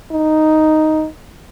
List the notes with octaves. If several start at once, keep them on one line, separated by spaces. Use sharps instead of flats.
D#4